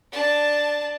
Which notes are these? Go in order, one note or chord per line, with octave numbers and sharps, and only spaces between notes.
D4 A5